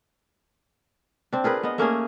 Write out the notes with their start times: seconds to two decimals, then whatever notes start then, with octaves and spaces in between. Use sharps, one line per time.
1.33 C4 D4
1.44 F4 G#4 A#4 B4
1.63 B3 D#5
1.78 A3 A#3 C#4 G#4